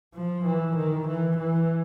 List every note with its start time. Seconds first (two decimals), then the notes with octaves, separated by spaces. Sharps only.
0.15 F3
0.45 E3
0.76 D#3
1.07 E3
1.38 E3